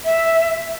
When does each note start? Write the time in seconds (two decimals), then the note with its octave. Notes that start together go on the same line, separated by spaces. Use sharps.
0.05 E5